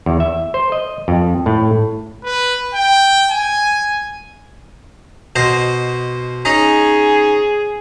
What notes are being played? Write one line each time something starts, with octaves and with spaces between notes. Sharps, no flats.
E2
E5
C5
D#5
F2
A2
B4
G5
G#5
B2 C5 D#5
C#4 D#4 G#4 D#5